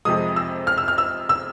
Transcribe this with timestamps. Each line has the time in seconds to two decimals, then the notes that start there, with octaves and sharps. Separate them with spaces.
0.05 F2 C3 F3 G#3 D#6
0.36 E6
0.67 F6
0.78 E6
0.88 F6
0.98 E6
1.29 E6